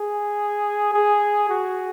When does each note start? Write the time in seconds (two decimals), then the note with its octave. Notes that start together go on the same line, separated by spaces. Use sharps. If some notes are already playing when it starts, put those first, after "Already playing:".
Already playing: G#4
0.94 G#4
1.49 F#4